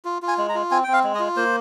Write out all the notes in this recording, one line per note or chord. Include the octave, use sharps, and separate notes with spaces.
F4
F4
G#5
G#3
A#5
F4
C4 G#5
C4 G5
F5
G#3
D#5
F4
A#3 C5